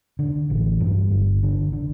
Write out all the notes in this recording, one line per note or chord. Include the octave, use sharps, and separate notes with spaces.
D3
A1
G2
G1
D3
D3